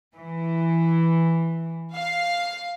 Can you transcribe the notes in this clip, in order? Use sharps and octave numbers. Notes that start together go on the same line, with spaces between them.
E3
F5